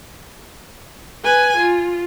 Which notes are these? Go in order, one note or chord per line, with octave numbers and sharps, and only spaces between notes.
B4 G#5
F4